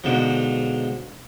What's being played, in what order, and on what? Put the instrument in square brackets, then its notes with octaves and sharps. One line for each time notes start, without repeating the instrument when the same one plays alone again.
[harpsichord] G#2 B2 D3 F3